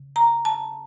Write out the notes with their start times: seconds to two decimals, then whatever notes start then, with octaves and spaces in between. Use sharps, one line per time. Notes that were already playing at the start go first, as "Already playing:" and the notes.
Already playing: C#3
0.16 A#5
0.45 A5